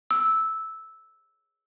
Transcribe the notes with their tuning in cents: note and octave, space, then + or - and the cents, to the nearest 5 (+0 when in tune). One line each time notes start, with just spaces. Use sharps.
E6 -10